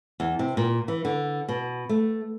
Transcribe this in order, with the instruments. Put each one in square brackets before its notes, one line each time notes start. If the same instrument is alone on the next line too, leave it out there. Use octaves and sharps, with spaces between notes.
[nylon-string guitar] E2
C3
A#2
E3
D3
B2
A3